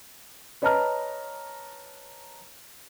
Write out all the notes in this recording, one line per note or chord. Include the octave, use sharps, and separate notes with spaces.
B4 C#5 D#5 A5 A#5 F6